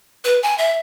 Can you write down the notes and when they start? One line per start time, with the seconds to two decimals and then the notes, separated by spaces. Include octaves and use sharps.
0.25 B4
0.43 G#5
0.58 E5